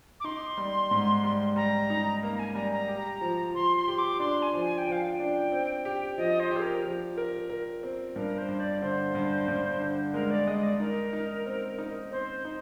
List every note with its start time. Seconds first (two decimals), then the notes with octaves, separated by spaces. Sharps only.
0.20 D6
0.24 D#4 C6
0.58 G3
0.91 G#2
1.24 G3
1.56 G3 A#5
1.90 D#4
2.23 A#3
2.35 A#5
2.39 G#5
2.55 G3 A#5
2.72 A#5
2.88 G4
3.21 F3
3.54 F3 C6
3.76 C6
3.88 G4
3.98 D6
4.20 D4 C6
4.42 G#5
4.53 F3
4.65 G#5
4.78 G5
4.86 F3
4.92 F5
5.07 G5
5.19 D4
5.52 C4
5.85 G4
6.18 F3 D#5
6.40 C5
6.51 G4
6.57 G#4
6.62 A#4
6.84 F3
7.18 A#4
7.49 A#4
7.83 C4
8.16 G2 A#4
8.38 C5
8.48 G2
8.60 D5
8.82 D3 C5
9.15 G2
9.48 G2
9.80 D3
10.14 G#3 A#4
10.31 D5
10.47 G#3 D#5
10.63 D5
10.79 D#4 A#4
11.13 D#4
11.46 C4
11.78 D#4
12.11 C4 C5
12.45 D#4